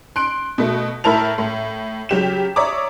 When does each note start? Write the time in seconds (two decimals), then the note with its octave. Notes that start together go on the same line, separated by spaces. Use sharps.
0.16 C6 F#6 D7
0.58 B2 A3
1.04 A2 E4 A#4 A5 F7
1.38 A2
2.09 C#3 F#3 G4 E7
2.56 C#5 D5 E5 A#5 D6 D#6